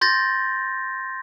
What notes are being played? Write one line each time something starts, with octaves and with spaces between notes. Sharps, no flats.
C6 G6 A6 A#6